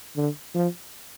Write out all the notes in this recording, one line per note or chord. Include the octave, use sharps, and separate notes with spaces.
D3
F3